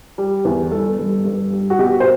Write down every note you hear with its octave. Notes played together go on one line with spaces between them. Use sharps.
G3
E2
G1 A4
G2
G2
G3
F#4
B2 G4
C5